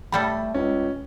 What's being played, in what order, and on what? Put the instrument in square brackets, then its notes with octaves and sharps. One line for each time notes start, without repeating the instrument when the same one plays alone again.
[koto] A2 G3 A4 [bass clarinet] A3 [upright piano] B5
[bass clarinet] C#2 [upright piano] C#4